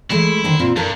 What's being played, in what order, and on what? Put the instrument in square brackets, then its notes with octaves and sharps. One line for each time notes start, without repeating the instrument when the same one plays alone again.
[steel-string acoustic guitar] E3 G#3 A3 [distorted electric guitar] E4
[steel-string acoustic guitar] D3 D#3 C5
A#2 C4 F4
[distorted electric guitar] G2 [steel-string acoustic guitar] A4 A#4